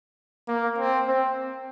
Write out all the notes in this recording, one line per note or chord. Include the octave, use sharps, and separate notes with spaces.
A#3
C4
C4